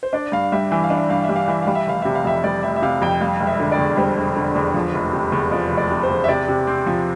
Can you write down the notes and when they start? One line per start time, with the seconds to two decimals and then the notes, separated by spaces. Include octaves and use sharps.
0.03 C5
0.13 D4 D5
0.32 G2 F5
0.52 G3 E5
0.71 E3 E5
0.84 F5
0.90 D4
0.97 E5
1.10 G2 F5
1.24 E5
1.29 G3
1.36 F5
1.48 E3 E5
1.62 G3 F5
1.75 E5
1.87 F1 F5
2.02 C3 E5
2.15 F5
2.25 F2 E5
2.44 G3 D5
2.63 F1 E5
2.76 E5
2.82 C3 F5
3.02 F2 G5
3.21 G3 F5
3.40 E1
3.47 E5
3.60 D3
3.72 D5
3.79 E2
3.97 G3 C5
4.18 E1
4.36 D3
4.55 E2
4.74 F3
4.94 F1
5.13 C3
5.32 E2
5.51 F3 D5
5.70 F1
5.77 D5
5.91 C3
6.03 C5
6.10 E2
6.24 E5
6.28 C3 D5
6.48 C3
6.67 C4
6.86 F3